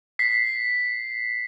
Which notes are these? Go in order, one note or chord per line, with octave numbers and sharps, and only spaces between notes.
B6 C7